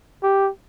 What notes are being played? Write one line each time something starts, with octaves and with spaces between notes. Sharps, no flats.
G4